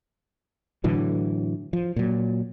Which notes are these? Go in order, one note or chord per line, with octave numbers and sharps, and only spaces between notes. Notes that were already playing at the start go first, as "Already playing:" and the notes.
A2 D3 E3 F#3
F3
A#2 F#3